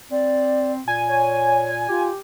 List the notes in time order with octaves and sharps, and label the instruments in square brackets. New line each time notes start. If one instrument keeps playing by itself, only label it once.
[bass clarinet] C4 [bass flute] D5
[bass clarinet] A#2 [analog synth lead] G#5
[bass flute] C#5
[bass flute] F4 [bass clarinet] G4